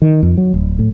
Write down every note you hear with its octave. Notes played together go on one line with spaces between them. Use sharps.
D#3
F2
F#3
D1
A2